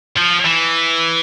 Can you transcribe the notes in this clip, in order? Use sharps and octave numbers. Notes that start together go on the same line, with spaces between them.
F3
E3